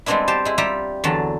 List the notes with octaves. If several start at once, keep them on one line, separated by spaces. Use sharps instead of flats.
G3 G#3 B3 C4 D4 E4
G4 C5 A5
G#3 E4
G3 F4 G4 E5 A#5
E2 D3 F#3 A5